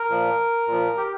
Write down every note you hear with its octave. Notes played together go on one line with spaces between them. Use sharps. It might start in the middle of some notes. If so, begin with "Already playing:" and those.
Already playing: A#4
A#2 F3
A#2 F3
G4